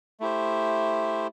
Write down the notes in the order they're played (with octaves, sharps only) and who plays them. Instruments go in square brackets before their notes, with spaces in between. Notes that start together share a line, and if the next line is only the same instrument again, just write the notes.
[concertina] A3 E4 G4 C5